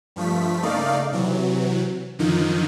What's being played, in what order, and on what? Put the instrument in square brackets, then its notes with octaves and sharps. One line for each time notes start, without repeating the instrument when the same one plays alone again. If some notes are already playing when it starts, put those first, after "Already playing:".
[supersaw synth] G2 F3 A3 B6
C#3 A3 A#3 D#4 D5 F5
C3 E3 F#3
F#2 D3 D#3 F3 D#4